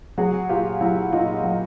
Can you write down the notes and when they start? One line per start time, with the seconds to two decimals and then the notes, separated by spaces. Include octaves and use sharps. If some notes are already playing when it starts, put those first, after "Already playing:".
0.18 F#3 F#4 G#4
0.49 A#2 F4 G4
0.81 F#3 E4 F#4
1.12 A#2 D#4 F4
1.44 F#3